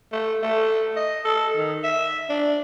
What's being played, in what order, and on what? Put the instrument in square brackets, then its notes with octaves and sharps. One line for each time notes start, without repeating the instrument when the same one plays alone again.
[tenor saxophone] A3
A3
D#5
A4
D#3
E5
D4